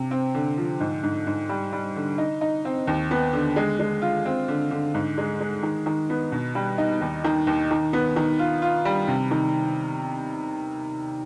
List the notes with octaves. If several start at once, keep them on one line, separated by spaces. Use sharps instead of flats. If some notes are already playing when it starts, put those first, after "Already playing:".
Already playing: C3
C4
D3
F3
G#2
G#2
G#2
G3
G3
D3
D#4
D#4
C4
D#2
B3
D3
G#3
G#3
F4
C4
D3
D3
G#2
G#3
G#3
D#3
D#3
B3
B2
G3
D#4
D#2
D#3
D#2
D#3
B3
D#3
F4
F4
G3
C3
D#3